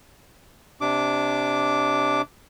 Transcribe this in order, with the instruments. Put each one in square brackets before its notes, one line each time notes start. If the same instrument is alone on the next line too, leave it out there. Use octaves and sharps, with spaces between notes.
[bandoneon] C3 D4 D6